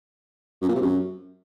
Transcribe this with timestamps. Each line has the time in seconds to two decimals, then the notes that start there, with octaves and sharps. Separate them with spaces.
0.62 F#2
0.69 A#2
0.75 C3
0.82 F#2